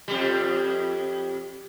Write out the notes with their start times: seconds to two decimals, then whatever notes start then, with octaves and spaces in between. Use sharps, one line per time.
0.08 F2 G3